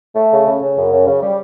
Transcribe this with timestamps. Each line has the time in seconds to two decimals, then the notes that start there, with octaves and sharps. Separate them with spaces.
0.16 A3
0.32 C#3
0.46 C#3
0.61 C#3
0.77 F#2
0.92 C#3
1.07 C#3
1.22 G3